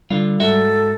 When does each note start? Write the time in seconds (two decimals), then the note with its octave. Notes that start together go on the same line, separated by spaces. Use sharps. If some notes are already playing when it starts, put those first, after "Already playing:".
0.11 D3 G3 F4
0.40 G#2 F#4 A4 E5